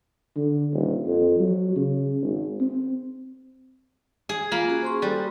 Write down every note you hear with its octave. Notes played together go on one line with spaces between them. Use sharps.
D3
D#1
F2
F#3
C#3
G#1
C4
G#4
A#3 F4 B5
C#4 F#4 G#4
C5 C6 C#6
G3 F#4 G4 A4